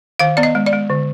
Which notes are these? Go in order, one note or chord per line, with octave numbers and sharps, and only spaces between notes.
D#3 F5
B3 D5
D#5
G#3
D5
G#3
D3